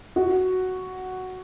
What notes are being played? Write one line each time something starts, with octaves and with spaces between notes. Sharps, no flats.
F#4